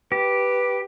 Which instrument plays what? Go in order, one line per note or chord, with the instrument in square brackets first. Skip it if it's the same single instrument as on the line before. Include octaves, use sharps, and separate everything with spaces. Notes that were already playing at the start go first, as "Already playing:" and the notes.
[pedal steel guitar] G4 [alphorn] B4